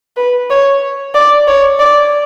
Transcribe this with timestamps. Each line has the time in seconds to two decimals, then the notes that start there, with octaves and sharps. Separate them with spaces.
0.17 B4
0.50 C#5
1.14 D5
1.47 C#5
1.79 D5